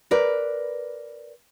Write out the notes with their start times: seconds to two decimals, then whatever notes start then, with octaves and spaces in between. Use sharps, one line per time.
0.11 A#4 B4 D5